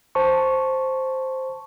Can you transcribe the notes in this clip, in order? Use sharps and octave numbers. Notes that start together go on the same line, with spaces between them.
C5 A5 C#6